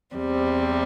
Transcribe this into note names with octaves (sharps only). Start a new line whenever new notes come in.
E2 C3 G3 C4